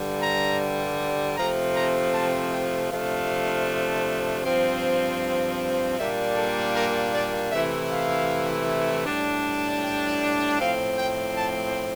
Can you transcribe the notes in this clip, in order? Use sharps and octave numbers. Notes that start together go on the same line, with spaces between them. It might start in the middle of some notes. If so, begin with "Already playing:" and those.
Already playing: G2 D3 G3
A#5
C3 F3 A3 C4 A#5
A#5
A5
G5
C3 F3 A3 D4 F5
G2 F3 C4
A#2 G3 A#3 D4 E5
A4
A#4
D5
C3 E3 A3 E4 E5
F5
A2 G3 D4
G5
A2 F3 C4 F5
G5
A5